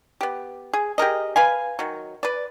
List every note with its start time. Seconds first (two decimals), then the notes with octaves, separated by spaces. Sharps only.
0.21 B3 G4
0.73 G#4
0.98 G4 G#4 A#4 D#5
1.36 B4 F5 G#5
1.79 D#3 F#3
2.23 B4 D5